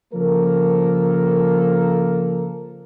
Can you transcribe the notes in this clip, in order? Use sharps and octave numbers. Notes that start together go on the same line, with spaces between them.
C#3 F3 A#3 A4 A#4